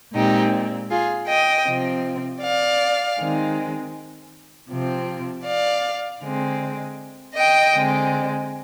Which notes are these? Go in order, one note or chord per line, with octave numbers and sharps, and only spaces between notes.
A#2 G#3 C4 D#4 G4
F4 G#4
D#5 G5
C3 F3 C4
D5 F5
D#3 G#3 C4
C3 F3 C4
D5 F5
D3 G#3 C4
D#5 G5
D3 G#3 C4